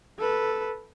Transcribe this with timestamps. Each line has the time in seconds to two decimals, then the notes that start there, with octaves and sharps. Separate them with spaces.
0.18 A4 B4